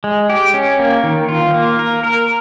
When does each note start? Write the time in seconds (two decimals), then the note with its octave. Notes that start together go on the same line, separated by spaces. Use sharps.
0.04 G#3
0.29 G4
0.54 C#4
0.79 A#3
1.03 D#3
1.29 F4
1.54 A#3
1.79 A#4
2.03 A#4